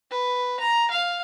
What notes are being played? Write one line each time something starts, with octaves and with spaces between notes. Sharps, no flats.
B4
A#5
F5